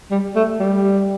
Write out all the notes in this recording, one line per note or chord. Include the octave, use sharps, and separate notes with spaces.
G3
A3
G3